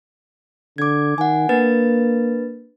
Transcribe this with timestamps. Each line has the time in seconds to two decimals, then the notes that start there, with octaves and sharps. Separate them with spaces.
0.78 D3 D6 G#6
1.18 D#3 F#5 G#5
1.49 A#3 D4 B4 A6